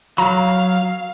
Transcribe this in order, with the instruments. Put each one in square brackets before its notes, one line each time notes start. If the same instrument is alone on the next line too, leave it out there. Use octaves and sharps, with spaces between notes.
[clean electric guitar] F#3 [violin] F5 [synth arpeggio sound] A#5